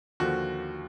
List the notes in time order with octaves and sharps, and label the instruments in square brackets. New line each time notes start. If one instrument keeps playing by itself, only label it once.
[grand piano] D#2 D3 F3 F#4